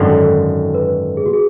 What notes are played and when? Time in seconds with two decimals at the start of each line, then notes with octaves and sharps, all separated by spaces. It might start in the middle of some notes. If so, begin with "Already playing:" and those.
Already playing: G#1 F#2 D3 A4
0.74 B4
1.17 G#4
1.26 F#4
1.34 G#4